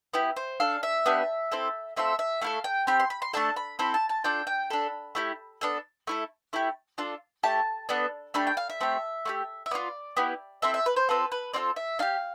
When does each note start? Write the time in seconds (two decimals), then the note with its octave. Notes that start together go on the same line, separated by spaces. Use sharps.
0.13 B3 E4 G4
0.36 C5
0.60 D4 A4 F5
0.83 E5
1.06 B3 D4 G4
1.51 C4 E4 A4
1.96 A3 C4 F4 A4 E5
2.19 E5
2.41 A3 E4 A4 F5
2.64 G5
2.87 C4 G4 B5
3.00 C6
3.10 B5
3.22 C6
3.33 A3 D4 A4 A5
3.56 B5
3.79 C4 E4 A4 B5
3.94 A5
4.09 A5
4.24 D4 F4 A4 G5
4.47 G5
4.70 D4 A4 B5
5.15 A3 E4 G4
5.61 B3 D4 A4
6.07 A3 E4 A4
6.53 A3 E4 G4
6.98 D4 F4 A4
7.43 A3 E4 G4 A5
7.89 B3 D4 A4
8.34 A3 D4 G4 B5
8.47 G5
8.57 F5
8.69 E5
8.80 A3 C4 G4
9.25 A3 E4 G4
9.66 E5
9.71 B3 D4 F4 D5
10.17 B3 E4 G4
10.62 C4 E4 A4 E5
10.74 E5
10.86 B4
10.96 C5
11.09 C4 F4 A4 B4
11.32 B4
11.53 C4 F4 A4 D5
11.76 E5
11.99 D4 G4 F5